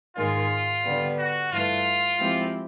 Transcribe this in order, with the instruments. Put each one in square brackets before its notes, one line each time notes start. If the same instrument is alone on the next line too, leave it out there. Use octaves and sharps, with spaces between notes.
[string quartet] G#2 D#3 G#3 [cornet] F4
[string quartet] D3 G3 B3
[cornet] F#4
[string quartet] G2 E3 A3 [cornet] F4
[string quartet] F3 G#3 C4 E4 G4